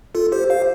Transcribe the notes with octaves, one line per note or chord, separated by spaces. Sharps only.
F4 A4
G4 C5
C5 F5